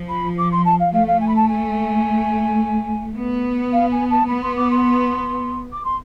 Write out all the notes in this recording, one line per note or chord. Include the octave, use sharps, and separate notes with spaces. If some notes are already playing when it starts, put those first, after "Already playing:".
Already playing: F3
B5
D6
C6
A5
F5
A3 F5
F5
G#5
B5
A5
G#5
B3
F5
G#5
A5
B3 B5
C6
D6
C6
D6
C6